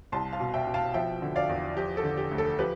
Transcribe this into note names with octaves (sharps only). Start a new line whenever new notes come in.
C2 A5 C6
F5 A5
B2
E5 G5
B2
F5 A5
F3 E5 G5
D3
D5 F5
E2
F3 G4
A4
D3
G4
D2
A4
F3 G4 B4